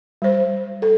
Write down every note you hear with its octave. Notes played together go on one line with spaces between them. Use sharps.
G3 C5
A4